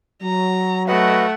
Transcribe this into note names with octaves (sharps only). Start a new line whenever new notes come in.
F#3 A#5
A3 F#4 B4 D#5 F#5